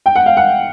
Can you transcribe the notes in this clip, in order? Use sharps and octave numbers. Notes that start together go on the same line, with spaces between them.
G5
F#5
F5
F#5